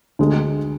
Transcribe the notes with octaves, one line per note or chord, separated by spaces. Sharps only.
D2 D3 G#3